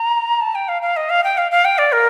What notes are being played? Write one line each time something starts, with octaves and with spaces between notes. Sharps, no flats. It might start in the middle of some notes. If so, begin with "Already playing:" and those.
Already playing: A#5
A5
G5
F5
F5
D#5
F5
G5
F5
F5
G5
D5
A#4